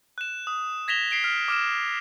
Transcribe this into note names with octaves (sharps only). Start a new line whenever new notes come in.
F#6 E7
D#6
G#6 A#6 B6 E7 F7 G7
B6 C7 D7 G7
F6 B6
D6 F6 E7